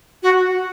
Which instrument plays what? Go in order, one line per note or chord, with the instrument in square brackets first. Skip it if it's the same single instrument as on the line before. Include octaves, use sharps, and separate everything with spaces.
[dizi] F#4